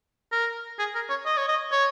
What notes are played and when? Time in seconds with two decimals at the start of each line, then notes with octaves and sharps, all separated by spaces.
0.32 A#4
0.79 G#4
0.95 A#4
1.09 C#5
1.26 D#5
1.37 C#5
1.48 D#5
1.72 C#5